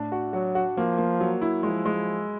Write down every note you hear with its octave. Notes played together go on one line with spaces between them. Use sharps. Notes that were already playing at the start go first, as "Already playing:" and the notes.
Already playing: A2 D4
F#4
F#3 F#4
F#4
F3 A#3
A#3
F#3
E4
F3 G#3
G#3